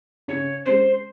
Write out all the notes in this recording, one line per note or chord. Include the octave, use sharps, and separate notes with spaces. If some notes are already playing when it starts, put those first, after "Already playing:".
C#3 C#5
G#3 C#4 C5